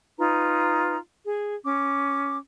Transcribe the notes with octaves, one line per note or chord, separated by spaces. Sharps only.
D#4 F4 B4 A#5
G#4
C#4 D6